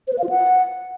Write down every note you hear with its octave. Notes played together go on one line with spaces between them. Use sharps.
C5
B4
F5
F4
F#5